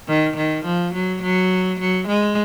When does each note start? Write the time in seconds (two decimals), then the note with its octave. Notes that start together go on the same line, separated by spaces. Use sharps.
0.08 D#3
0.37 D#3
0.65 F3
0.94 F#3
1.22 F#3
1.79 F#3
2.08 G#3